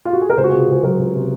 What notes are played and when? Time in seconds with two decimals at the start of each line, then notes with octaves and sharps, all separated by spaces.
0.05 F4
0.13 F#4
0.21 G#4
0.30 A#4
0.37 C#2 G#4 C5
0.44 F#4
0.49 F4 G#4
0.53 C3
0.68 C#2 G#4 C5
0.83 F#3 F#4 A#4
0.99 C#2
1.14 C3